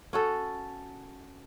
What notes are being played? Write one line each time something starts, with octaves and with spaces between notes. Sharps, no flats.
C#4 F#4 A4